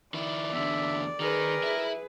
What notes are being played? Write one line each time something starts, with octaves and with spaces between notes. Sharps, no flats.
D#3 E4 D5
E2 D3 E5
D#3 G#4 A#4 B4
E4 E5